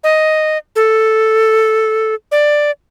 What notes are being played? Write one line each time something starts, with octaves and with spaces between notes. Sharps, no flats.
D#5
A4
D5